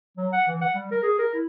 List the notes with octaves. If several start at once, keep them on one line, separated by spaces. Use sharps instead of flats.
F#3
F#5
E3
F#5
G3
A#4
G#4
A#4
E4